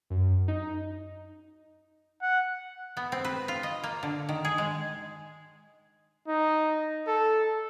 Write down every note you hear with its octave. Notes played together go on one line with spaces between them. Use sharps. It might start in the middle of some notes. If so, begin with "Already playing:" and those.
F#2
D#4
F#5
B3
C4
B4
F4
D#5
A#3
D3
D#3
G#4
G#3
D#4
A4